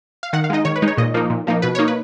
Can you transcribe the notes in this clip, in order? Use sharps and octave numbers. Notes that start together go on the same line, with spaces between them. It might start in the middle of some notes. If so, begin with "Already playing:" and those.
F5
D#3 F#5
F5
G#3 D#4 D#5
D#3 C#5
B4
G#3 D#4
C#5
A#2 D#5
F3 A#3 D#4
A#2
F3 A#3 D#4
B2 B4
A#3 D#4 C#5
B4